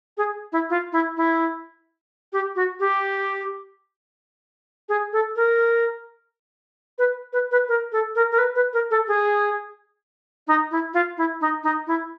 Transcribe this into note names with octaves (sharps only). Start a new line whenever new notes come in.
G#4
E4
F4
E4
E4
G4
F#4
G4
G#4
A4
A#4
B4
B4
B4
A#4
A4
A#4
A#4
B4
B4
A#4
A4
G#4
D#4
E4
F4
E4
D#4
D#4
E4